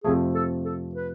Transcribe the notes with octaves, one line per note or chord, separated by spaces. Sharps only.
F2 C3 F3 A3 G#4
A4
A4
B4